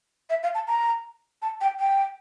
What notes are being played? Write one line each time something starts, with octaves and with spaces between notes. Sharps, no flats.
E5
F5
A5
A#5
A5
G5
G5